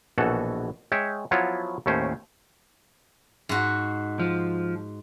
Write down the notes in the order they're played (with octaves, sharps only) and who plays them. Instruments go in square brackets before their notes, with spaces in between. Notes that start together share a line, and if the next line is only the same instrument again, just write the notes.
[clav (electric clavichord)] A#1 B2 E3 F#4 A4
G#3 C#5 E5 G5
F3 F#3 B3 E4 F4 C#5
D#2 A2 A3 C#4 C5
[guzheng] G#2 F#4
[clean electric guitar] F3